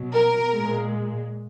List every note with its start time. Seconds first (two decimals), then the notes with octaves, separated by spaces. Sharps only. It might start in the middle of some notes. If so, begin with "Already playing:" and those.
Already playing: B2 F#3
0.13 A#4
0.53 A#2 G#3